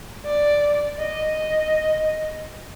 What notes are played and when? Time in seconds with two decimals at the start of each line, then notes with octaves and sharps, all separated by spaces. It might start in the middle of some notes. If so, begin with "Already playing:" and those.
0.25 D5
0.99 D#5